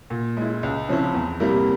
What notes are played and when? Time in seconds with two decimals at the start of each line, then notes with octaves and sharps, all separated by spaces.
0.10 A#2
0.37 G#3 E4
0.63 C#2
0.88 C#3 F3 C4 E4
1.14 E2
1.40 C3 G3 A#3 E4